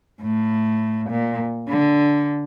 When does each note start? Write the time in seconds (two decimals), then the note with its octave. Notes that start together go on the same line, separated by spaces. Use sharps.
0.22 A2
1.10 A#2
1.70 D3